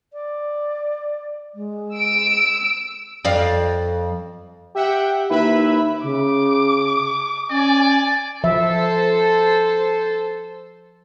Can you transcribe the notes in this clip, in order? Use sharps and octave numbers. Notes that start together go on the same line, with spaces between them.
D5
G#3
E6 D7
F2 D5 F5
G4 E5 F#5 G5
D#2 E4 B4 E5 B5
C#3 D6
C#4 D5 G#5
F3 A4 C5 E5